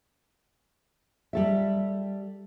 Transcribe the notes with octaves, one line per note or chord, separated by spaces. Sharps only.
G3 A4 E5